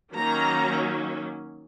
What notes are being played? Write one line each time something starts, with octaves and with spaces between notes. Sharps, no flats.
D#3 F#3 A#3 C#4 A#5